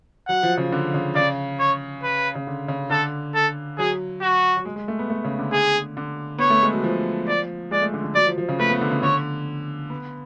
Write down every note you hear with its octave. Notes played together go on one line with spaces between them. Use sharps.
F#3 F#5
F3
C#3
D3
C#3
C#3 D5
C#5
B4
C#3
D3
C#3
D3 A4
A4
F#3 G#4
F#4
F#3
G#3
G#3
A3
B3
A3
C#3
D3
G#4
D3
B3 C#5
A3
G#3
F#3
F3
D5
G#3 D5
A3
D3
D3
F#3 D5
F3
F3
C#3
A3 B4
B3
D3
C#3
D3 C#5
B3